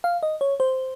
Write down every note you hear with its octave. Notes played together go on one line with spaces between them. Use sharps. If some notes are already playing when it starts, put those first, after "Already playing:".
F5
D#5
C#5
C5